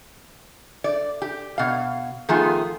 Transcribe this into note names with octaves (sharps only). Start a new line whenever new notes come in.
D5
G4
B2 F5
D#3 F3 A3 B3 F4 G#4